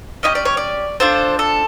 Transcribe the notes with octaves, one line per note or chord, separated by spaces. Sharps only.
C#4 E4 G4 D#5
D5
C#5
D5
D4 F4 A4 C5
A4